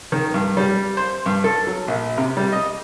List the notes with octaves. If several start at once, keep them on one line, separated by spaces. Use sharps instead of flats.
D#3
G2
G3
C5
G2
A4
F#3
A#1
C3
G3
D#5